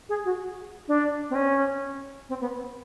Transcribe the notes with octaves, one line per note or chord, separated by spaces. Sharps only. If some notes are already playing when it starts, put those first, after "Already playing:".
G#4
F#4
D4
C4
C#4
C4
B3